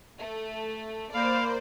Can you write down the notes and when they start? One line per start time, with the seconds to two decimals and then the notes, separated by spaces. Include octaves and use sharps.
0.19 A3
1.14 A#3 C5 D5 F5 B5